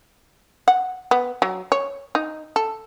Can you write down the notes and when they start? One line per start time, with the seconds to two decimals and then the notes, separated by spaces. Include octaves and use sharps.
0.68 F#5
1.11 B3
1.42 F#3
1.72 C#5
2.15 D#4
2.56 A4